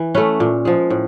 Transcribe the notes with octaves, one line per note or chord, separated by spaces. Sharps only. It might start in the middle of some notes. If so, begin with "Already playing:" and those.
Already playing: E3
A3 C#4 B4
A#2
F3 G#3
A2